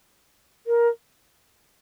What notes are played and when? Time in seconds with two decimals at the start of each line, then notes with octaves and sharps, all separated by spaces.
0.67 A#4